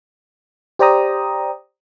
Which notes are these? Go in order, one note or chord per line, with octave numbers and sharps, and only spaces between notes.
G4 C5 D5 G5 A#5 D#6